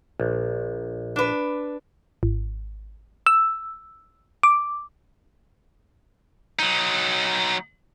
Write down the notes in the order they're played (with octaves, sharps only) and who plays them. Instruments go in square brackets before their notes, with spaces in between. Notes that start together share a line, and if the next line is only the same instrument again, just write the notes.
[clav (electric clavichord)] A#1
[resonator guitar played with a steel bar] D4 B4
[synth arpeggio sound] G#1
E6
D6
[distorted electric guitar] F#3 D#4